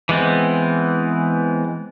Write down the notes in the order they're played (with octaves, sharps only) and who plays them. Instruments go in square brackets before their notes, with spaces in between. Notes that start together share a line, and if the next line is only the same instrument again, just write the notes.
[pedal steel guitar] E3 G#3 B3 C4